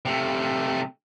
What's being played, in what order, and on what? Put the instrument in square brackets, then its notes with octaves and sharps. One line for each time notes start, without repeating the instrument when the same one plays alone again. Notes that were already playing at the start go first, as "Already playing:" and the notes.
[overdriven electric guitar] C3 A3